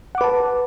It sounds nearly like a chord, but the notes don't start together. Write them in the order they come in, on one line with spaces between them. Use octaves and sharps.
F#5 D6 B4 A5